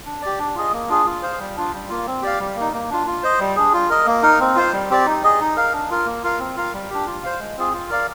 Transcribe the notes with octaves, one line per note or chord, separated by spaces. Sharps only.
D4
G4 D5
D4
F4 G#4 D#5
A#3
D4 F4 G#4
F4
C5 F5
G3
D4 F4
G3
A#3 F4
C4
G4 D5 F5
G3
A#3 D#4
A#3
D4 F4
F4
C5 D#5
G3
D4 G#4
F4
A#4 D#5
A#3
D#4 A#4
C4
F4 C5 F5
G3
C4 G4 D5
D#4
G#4 D#5
D#4
A#4 F5
D4
F4 A#4
A#3
F4 A#4 F5
C4
F4 A#4 F5
G3
D4 G4
F4
C5 F5
G#3
C4 F4 G#4
F4
A#4 D5 F5